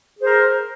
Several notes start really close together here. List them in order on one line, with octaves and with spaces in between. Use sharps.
G#4 C5 A#4